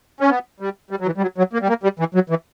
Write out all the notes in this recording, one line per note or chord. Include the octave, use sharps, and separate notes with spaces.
C#4
B3
G3
G3
F#3
E3
G3
F#3
F#3
A#3
G3
A#3
G3
E3
F#3
E3